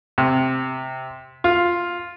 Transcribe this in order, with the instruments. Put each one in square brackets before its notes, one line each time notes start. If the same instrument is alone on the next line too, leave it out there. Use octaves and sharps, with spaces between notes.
[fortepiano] C3
F4